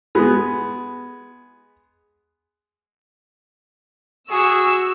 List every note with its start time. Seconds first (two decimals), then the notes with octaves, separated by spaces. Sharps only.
0.15 G#3 B3
4.30 F#4 G#4 E6